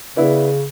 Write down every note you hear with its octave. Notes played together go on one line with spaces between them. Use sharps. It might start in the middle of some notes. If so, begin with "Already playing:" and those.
C#3 B3 E4 B4 D5